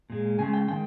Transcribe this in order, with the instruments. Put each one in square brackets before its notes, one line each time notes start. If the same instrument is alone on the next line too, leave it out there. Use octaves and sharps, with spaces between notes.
[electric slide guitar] A#2 G#3
C#3 G#3 G#5
G5
D#3 G#3 G5